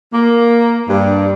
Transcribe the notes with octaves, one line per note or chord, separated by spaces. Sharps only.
A#3
G2